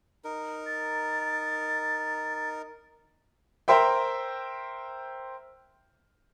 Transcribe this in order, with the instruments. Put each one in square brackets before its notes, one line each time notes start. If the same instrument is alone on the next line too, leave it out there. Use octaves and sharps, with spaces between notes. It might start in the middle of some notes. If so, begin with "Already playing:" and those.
[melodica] D#4 A#4
[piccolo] A6
[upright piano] A#4 C5 E5 G5